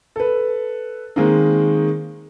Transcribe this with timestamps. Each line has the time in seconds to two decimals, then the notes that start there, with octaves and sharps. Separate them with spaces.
0.16 A4 B4
1.16 D#3 G#3 A#3 C4 D#4